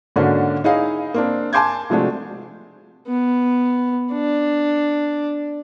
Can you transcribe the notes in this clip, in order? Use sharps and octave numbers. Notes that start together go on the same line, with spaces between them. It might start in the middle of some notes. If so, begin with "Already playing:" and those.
G#2 D3 A#3 C#4 D4 F#4
D#4 E4 G#4 C#5 D#5 F5
A#3 C4 D4
G#5 A5 C6 D6 G6 G#6
C3 F3 G#3 A3 D4 F#4
B3
D4